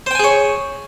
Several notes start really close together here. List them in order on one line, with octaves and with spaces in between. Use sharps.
C5 G5 G#5 G#4 C#5